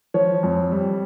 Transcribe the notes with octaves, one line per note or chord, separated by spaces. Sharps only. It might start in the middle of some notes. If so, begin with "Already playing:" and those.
F3 C#5
F2
G3